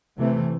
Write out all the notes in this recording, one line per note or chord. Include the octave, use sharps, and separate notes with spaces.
C3 E3 A3 C4